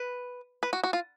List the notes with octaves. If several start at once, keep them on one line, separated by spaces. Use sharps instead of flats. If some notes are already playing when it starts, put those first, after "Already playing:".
Already playing: B4
B4
F#4
F#4
F4